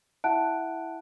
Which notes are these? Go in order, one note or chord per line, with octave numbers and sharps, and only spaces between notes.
E4 E5 F#5 A5 F#6 D7